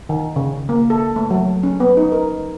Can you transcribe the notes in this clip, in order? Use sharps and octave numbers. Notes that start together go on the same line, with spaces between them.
D#3
C#3
A#3
A4
A3
F#3
C#4
B3
D#4
A#4